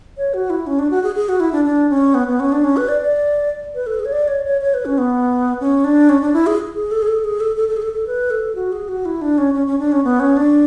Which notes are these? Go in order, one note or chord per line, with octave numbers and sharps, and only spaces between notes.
C#5
F#4
E4
C#4
D4
F#4
G#4
G#4
F#4
E4
D4
D4
C#4
B3
B3
C#4
D4
C#4
B4
D5
D5
B4
A4
G#4
C#5
D5
C#5
C#5
C#5
B4
C#4
B3
C#4
D4
C#4
D4
E4
G#4
G#4
A4
G#4
A4
G#4
A4
A4
A4
G#4
A4
A4
B4
A4
F#4
G#4
F#4
E4
D4
C#4
C#4
C#4
D4
C#4
B3
C#4
D4